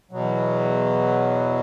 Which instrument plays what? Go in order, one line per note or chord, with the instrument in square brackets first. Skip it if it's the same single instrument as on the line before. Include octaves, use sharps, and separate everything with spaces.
[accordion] E2 B2 F#3